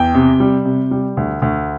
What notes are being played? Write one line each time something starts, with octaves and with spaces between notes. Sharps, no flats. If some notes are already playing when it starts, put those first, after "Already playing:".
Already playing: E2 G5
C3
G3
C3
G3
D2
D2